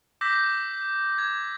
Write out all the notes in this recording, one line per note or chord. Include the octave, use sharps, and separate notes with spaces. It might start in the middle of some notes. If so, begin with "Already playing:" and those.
D6 E6 G6 A#6 B6
G#6